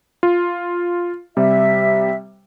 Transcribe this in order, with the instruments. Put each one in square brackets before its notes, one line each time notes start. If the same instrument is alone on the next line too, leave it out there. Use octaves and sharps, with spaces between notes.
[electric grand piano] F4
[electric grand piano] C3 G3 [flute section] E5